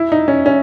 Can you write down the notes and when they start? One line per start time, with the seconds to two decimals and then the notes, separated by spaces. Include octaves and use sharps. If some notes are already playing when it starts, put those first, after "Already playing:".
Already playing: E4
0.12 D#4
0.28 C#4
0.46 C#4